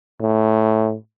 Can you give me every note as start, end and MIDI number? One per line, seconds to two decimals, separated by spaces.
0.20 0.95 45